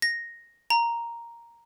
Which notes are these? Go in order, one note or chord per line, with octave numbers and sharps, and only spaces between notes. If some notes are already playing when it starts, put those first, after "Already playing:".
A#6
A#5